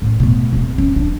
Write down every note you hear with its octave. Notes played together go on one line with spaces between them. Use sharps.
A1
B2 A3
D1
C#4
D4